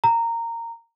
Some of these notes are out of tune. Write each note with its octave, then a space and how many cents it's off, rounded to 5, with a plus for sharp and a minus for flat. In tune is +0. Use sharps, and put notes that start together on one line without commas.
A#5 -15